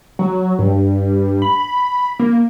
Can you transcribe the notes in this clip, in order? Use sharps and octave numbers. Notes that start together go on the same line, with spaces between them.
F#3
G2
B5
A#3